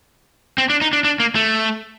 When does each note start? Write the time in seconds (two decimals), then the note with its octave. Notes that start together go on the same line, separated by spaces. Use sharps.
0.58 C4
0.70 D4
0.81 D#4
0.93 D4
1.04 D4
1.20 A#3
1.35 A3